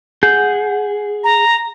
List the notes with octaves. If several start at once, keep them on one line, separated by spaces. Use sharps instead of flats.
G#4 F#5 G6
A#5